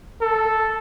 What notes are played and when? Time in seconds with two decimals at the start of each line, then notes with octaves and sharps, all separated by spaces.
0.22 A4